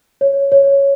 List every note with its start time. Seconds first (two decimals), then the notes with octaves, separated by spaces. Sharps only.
0.21 C#5
0.52 C#5